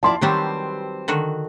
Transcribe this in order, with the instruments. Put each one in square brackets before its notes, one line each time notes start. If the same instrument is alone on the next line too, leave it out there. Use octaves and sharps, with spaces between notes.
[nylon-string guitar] F3 E4 D5 [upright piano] A5 C6
[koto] D#3 F#3 G3 [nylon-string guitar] C4 G4 B4
[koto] D3 D#3 F#4